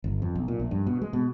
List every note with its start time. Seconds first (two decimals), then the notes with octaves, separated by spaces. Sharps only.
0.04 G1
0.22 F2
0.35 B1
0.48 A#2
0.60 A#1
0.71 G2
0.87 B2
1.02 G#3
1.13 B2